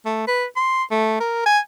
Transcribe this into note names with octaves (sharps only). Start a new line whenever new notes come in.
A3
B4
C6
A3
A#4
G#5